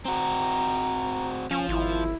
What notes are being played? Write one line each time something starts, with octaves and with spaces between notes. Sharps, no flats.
C4 F#4 A#5
F3 C#4
G#1 E4